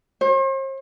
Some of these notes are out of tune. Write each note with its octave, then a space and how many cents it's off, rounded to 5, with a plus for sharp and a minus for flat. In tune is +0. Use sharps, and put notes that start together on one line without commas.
C5 +45